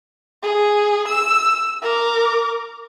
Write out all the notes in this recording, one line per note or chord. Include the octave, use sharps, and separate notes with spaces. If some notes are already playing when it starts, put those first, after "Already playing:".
G#4
E6
A#4 D6